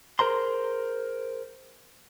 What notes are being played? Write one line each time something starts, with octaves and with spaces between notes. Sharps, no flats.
G#4 A#4 C5 A#5 C6